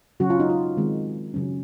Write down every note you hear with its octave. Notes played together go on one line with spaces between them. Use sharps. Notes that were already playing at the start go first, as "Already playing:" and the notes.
C#3 F#3 C#4 F#4
F4
D#4
F4
D#3 G#3 C4
C#3 F#3 C#4